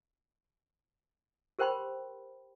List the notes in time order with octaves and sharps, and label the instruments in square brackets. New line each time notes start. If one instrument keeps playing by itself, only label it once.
[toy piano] G4 A#4 C5 G5 B5 C6